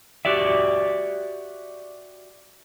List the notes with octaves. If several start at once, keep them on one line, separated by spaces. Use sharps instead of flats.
F#4 G4 D5 E5